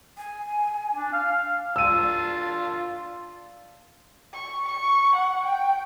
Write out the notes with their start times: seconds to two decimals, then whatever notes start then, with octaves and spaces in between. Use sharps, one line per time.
0.18 G#5
0.95 D4
1.13 F5
1.76 D4 F4 E6 D#7
4.34 C#6
4.68 C#6
5.16 F#5
5.45 G5